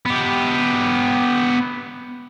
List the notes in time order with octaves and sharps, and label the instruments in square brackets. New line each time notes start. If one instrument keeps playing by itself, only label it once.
[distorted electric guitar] B3 G4